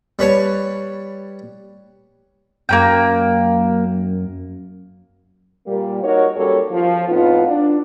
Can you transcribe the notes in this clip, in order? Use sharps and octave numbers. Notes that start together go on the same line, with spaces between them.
G3 B4 C#5 A5
F#2 A#3 C#4 G5
A#2 G3 A#3
D#4 F#4 A#4 C#5
F#2 G3 A#3 F#4 A4 C#5
F3
F2 A2 B3 D#4 F4
D4